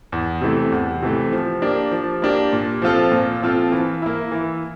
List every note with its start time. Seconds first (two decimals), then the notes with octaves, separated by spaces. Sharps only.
0.12 E2
0.41 C3 E3 A3
0.72 E2
1.02 C3 E3 A3
1.33 F3
1.62 A#3 D4 G4
1.91 F3
2.22 A#3 D4 G4
2.53 A#2
2.82 F3 C4 F4 A4
3.12 A#2
3.42 F3 C4 F4 A4
3.72 E3
4.02 A#3 E4
4.32 E3